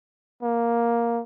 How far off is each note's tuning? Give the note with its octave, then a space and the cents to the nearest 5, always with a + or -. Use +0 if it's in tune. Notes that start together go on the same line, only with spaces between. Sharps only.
A#3 +5